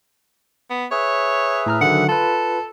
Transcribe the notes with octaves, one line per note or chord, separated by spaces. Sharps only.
B3
G#4 B4 C#5 E5
A2 A#5 F6
D3 D#3 F#3 F#5
F4 A4 B4